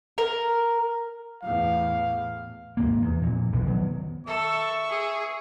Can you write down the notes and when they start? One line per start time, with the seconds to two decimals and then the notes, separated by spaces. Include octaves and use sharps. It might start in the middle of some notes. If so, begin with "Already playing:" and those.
0.18 A#4
1.43 E2 A2 F5
2.77 D#2 G#2 A#3
3.02 E2
3.22 F2 A#2
3.52 B1 E3
3.66 D#3 F#3 G#3 B3
4.27 A4 E5 C#6
4.90 G#4